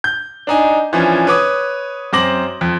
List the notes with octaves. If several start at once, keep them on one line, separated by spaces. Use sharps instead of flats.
G6
D4 D#4 G#5
E3 F3 C#4 D4
B4 C#5 D6 D#6
F#2 C4 C5 D6 A#6 F#7
F2